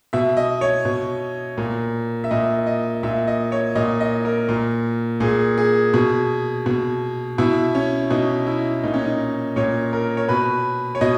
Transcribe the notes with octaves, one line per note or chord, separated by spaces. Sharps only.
B2 E5
D#5
C#5
B2
A#2
E5
A#2 D#5
D#5
A#2 E5
D#5
C#5
A#2 D#5
D#5
A#4
A#2
A#2 G#4
G#4
B2
B2
B2 E4
C#4
B2 D#4
E4
A#2 D#4
C#4
D#4
A#2 C#5
A#4
C#5
B2 B4
C#5
B2 D#5